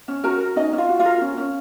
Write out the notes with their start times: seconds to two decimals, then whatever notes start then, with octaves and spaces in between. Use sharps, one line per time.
0.08 C#4
0.24 F#4 A#4 A#5
0.40 A#4
0.56 C#4 D#4 D#5
0.73 C#4
0.78 F4 F5
0.89 F#4
0.99 F4 F5
1.05 A#4
1.21 C#4
1.37 C#4